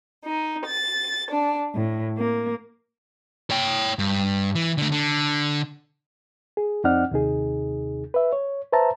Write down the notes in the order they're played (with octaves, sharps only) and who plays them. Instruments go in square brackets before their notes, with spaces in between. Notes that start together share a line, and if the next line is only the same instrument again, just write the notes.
[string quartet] D#4
A6
D4
A2
A#3
[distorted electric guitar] C#5 G5
G2
E3
D3 A3
D3
[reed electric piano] G#4
F2 C4 D#4 D5 F#5 F6
D#2 C3 D#4 G#4
B4 E5
C#5
B4 C5 E5 A5 A#5